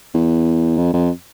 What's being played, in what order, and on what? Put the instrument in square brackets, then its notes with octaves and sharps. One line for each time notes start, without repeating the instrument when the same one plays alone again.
[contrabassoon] E2
F2
F2